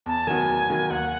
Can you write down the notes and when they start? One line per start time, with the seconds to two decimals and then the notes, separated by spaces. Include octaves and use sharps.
0.06 E2 A5
0.27 D#3 F#3 B3 F#4 G#5
0.49 E2
0.69 D#3 F#3 B3 F#4
0.90 D#2 F#5